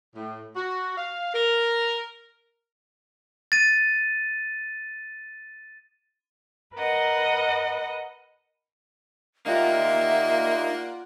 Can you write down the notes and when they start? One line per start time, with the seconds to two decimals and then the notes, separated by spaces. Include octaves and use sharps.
0.16 A2
0.56 F#4
0.98 F5
1.34 A#4
3.52 A6 D#7
6.75 A#4 B4 D#5 F#5
9.46 A#3 D#4 F4 G4 D5 E5 F#5